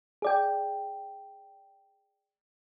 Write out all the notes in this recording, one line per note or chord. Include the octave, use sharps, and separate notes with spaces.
G#4 D5 G5